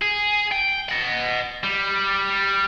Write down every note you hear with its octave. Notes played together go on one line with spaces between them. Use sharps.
G#4
G5
D#5 F#5
G3